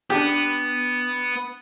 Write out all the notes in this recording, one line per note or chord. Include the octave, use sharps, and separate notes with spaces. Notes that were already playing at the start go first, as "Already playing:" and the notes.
B3 D4 G4